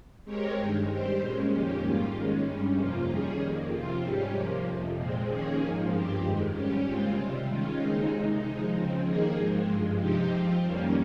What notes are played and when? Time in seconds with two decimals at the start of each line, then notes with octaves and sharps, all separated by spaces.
0.25 G#3 C4 G4 A#4 C#5
0.57 G2 D#3 G#3
0.87 G3 C4 G4 C5
1.19 A#2 G#3 C#4
1.51 F2 D#3 A#3 C#4 G4
1.82 G#2 G3 A#3 F4
2.13 D#3 G#3 C#4
2.45 G2 G3 C#4
2.76 F2 C3 F3 A#3 F4
3.08 D#3 G3 C#4 G#4
3.39 F2 D#3 A#3
3.70 C3 F3 C4 F4
4.02 G#2 G3 C#4 G4
4.33 C3 F3 A#3
4.65 F2 C3 F3
4.96 A#2 F3 G#3 C4
5.28 D#2 D#3 A#3 C#4 G#4
5.59 G#2 F3 A#3
5.90 G2 F3 C4 G4
6.22 F2 D#3 G#3
6.54 G#2 G3 C#4 G4
6.85 D#2 C#3 G#3 C4 F4
7.17 C3 G3 C4
7.49 D#3 G#3 C#4 F4
7.79 D#2 C#3 G#3 C4 D#4
8.10 C3 D#3 G#3 D#4
8.43 F3 G#3 D#4
8.74 C#3 F3 C4
9.05 D#2 D#3 A#3 D#4 G#4
9.37 G#2 F3 G#3 C4
9.68 G2 F3 G#3
9.99 C3 F3 C4 D#4 G4
10.32 F3 C4 F4
10.62 F2 D#3 G3 A#3 C#4